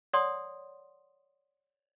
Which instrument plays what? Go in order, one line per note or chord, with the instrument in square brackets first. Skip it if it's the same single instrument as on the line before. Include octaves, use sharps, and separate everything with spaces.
[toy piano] C#5 D5 F#5 C6 D#6